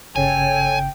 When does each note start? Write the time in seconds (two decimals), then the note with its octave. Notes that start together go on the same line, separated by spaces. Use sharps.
0.16 G1 C#3 A4 C#5 G5 G#5